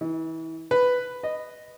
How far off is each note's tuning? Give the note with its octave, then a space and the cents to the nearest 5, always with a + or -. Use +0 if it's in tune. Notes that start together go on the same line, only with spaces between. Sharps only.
E3 -30
B4 +5
D#5 -10